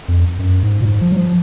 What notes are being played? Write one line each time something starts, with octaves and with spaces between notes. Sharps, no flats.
F2
F#2
G#2
A#2
G#2
F3
F#3
F3